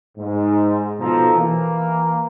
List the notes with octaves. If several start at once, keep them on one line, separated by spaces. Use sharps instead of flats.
G#2
B2 F3 D#4 A4 C5 A#5
E3 A#3